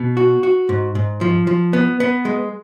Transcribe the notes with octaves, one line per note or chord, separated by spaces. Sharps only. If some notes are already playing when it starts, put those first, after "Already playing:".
Already playing: B2
F#4
F#4
G#2
G#2
F3
F3
B3
B3
G#3